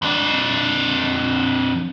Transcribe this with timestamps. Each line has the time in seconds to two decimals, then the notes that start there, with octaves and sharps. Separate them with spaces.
0.02 F2 D4